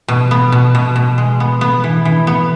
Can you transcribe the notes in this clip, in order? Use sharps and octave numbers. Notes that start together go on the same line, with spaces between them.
B2
B3
B2
B2
B2
G#3
B3
B3
E3
E3
B3